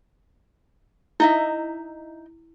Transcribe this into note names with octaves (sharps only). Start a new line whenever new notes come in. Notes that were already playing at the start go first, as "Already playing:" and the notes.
D#4 E4 D#5 E5